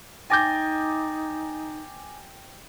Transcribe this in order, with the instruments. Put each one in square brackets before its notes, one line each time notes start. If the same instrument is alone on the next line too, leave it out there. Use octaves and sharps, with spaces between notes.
[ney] D#4 [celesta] G5 A6 A#6 [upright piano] G#5 D6 G6